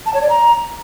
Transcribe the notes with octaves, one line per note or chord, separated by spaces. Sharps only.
A5
C#5
D5
A#5